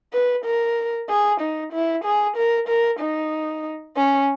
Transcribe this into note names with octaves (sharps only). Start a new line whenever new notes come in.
B4
A#4
G#4
D#4
E4
G#4
A#4
A#4
D#4
C#4